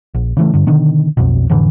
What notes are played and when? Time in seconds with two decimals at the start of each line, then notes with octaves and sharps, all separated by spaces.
0.14 A#1
0.37 C#3 E3 A3
0.54 G2 D3
0.67 B2 D3 D#3
1.17 B1 F2 B2
1.50 F2 A2 D3 E3